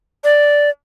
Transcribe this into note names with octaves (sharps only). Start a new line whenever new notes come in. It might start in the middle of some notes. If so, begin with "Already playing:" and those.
D5